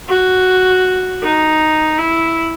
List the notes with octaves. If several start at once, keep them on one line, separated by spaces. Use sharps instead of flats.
F#4
D#4
E4